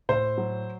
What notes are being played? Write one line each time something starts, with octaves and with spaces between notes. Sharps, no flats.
A2 C5
F#3